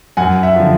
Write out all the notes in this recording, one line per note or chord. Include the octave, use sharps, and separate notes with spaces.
F#2 F#5 G#5
E5 F#5
D3 F3